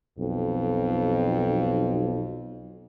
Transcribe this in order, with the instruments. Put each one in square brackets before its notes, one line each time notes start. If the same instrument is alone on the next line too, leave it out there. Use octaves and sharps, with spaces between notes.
[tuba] B1 [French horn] F2